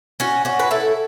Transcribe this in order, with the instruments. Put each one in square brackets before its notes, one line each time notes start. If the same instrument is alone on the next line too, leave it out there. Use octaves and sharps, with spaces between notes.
[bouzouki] C#4 F#4
C#4 F#4
B4
E4 A4